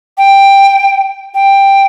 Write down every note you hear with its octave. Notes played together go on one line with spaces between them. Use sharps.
G5
G5